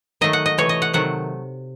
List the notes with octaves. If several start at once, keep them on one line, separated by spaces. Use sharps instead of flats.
D#3 F#3 A3 D#5
F#5
D#5
C3 E3 A3 C#5
D#5
F#5
C3 D#3 F#3 A3 F#5